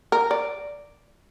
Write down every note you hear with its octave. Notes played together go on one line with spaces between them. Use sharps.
A#4
D5